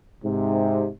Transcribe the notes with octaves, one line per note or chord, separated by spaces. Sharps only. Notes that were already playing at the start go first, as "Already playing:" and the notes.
G#2 C3